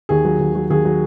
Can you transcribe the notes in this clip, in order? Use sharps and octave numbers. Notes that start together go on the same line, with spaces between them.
D#2 G#4
F#3
D#2
F#3
D#2 G#4
F#3